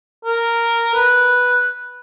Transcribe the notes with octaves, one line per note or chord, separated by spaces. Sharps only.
A#4
B4